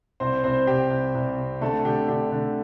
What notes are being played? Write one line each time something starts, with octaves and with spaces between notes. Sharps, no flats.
C2 C4 C5
C2 C4 C5
C2 G4
C2
C2
C3
D3 A3 A4
D3 G4
D3 G4
D3